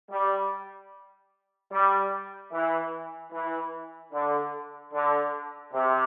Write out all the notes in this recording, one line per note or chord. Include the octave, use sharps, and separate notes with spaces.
G3
G3
E3
E3
D3
D3
C3